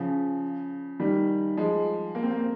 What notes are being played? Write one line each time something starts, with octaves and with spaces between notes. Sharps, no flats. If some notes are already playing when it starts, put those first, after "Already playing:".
Already playing: C#3 F3
D#3 G3
F3 G#3
A#3
C4
A#3
C4